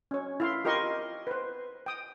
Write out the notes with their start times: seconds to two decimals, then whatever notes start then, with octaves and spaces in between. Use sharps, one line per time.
0.11 C#4 C#5
0.40 E4 F5 C6
0.65 F4 G4 A#4 D#5 C6 C#6
1.27 B4 C5
1.86 G5 D#6